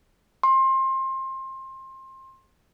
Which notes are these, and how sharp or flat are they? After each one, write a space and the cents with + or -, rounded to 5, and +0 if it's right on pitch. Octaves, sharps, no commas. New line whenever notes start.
C6 +25